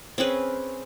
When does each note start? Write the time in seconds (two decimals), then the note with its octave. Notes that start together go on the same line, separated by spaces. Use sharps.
0.18 C4 C#4 G#4 B4